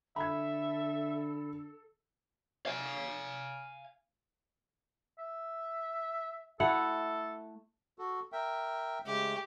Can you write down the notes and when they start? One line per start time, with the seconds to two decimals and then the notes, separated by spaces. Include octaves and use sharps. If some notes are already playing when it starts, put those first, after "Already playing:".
0.16 D3 A4 E5 B5 G#6
2.66 F5 G#5
5.19 E5
6.60 A3 E4 A4 F#5
7.98 F#4 A4
8.32 A#4 E5 G5
9.06 C#3 G#3 A3 G4